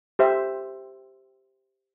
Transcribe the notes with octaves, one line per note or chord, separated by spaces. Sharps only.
G4 C5 E5